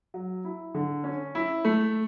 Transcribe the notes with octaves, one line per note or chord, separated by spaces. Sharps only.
F#3
E4
D3
C#4
E4
A3